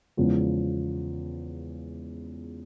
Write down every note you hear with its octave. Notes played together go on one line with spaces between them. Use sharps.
E2 C#3 F3 G#3